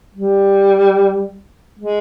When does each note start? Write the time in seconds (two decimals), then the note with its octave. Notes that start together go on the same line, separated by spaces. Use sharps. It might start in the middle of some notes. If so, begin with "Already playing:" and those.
0.15 G3
1.79 G#3